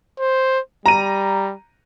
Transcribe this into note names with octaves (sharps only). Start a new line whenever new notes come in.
C5
G3 A#5 D#7